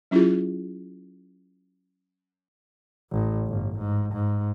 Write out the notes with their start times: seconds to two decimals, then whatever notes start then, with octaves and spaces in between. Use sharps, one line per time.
0.11 F#3 C#4 E4 F4 G4 G#4
3.11 A1
3.47 G1
3.79 G#2
4.13 G#2